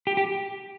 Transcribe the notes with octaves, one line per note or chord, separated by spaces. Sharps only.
G4
G4